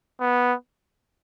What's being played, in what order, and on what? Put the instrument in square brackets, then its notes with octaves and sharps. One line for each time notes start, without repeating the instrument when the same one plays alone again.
[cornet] B3